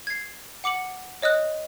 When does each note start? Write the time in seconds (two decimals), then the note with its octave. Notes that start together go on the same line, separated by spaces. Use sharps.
0.07 G#6 C7
0.64 F#5 D6 C#7 F#7
1.22 C#5 D#5 D#6 F#6